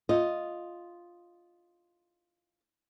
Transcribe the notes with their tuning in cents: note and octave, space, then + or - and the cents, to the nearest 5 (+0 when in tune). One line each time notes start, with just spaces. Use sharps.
F4 +0 D#5 +0